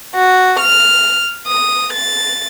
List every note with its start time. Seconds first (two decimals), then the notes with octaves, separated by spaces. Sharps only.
0.14 F#4
0.59 F6
1.46 D#6
1.93 A6